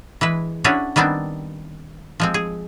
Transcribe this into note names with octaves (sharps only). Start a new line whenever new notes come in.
E3 G#3 B4
C#4 D4 E4 F#4 G#4 C#5
D#3 G3 B3 C4 D4
F3 G#3 C4
G#4